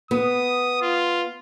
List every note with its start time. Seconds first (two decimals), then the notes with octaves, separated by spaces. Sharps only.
0.11 B3 D#6
0.82 F4